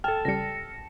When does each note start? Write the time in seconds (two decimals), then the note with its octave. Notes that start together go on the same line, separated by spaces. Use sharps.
0.04 A4 G5 A5 F6
0.25 C#2 G3 A#6 C#7